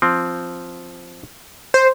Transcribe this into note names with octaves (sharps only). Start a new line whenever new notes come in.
F3 C4
C5